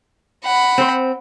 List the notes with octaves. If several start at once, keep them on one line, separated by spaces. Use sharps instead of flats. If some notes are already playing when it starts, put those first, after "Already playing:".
F#5 B5
C4 C5